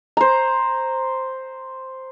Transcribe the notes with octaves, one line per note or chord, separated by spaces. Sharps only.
C5 A#5